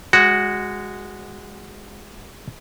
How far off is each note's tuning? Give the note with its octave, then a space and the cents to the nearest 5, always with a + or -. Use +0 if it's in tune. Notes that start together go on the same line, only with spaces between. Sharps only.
G#3 -15 F#4 +0